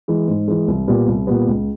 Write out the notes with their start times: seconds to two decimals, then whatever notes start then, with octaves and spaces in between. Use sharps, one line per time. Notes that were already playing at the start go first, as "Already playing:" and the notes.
0.08 E3 G#3
0.28 G#2
0.48 E3 G#3
0.68 C2
0.88 A#2 G3 B3
1.08 C2
1.27 A#2 G3 B3
1.47 C#2